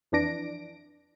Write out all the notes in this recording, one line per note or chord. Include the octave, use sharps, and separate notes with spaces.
F2 E3 D4 A#6 D7